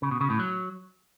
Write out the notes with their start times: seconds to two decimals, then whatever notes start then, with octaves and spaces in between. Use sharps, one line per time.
0.02 C#3
0.11 B2
0.21 C#3
0.30 A2
0.39 F#3